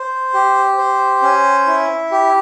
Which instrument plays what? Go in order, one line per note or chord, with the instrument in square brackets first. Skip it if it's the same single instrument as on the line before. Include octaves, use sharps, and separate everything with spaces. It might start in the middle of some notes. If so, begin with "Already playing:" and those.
Already playing: [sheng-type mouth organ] C5
G4
C5
C#4
E4
G4